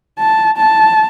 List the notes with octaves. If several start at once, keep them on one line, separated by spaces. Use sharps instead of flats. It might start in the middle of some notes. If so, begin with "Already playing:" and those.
A5
A5